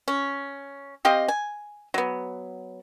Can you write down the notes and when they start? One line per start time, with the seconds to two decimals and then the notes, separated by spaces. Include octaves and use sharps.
0.08 C#4
1.05 C4 G4 D#5 F5
1.28 G#5
1.94 F#3 B3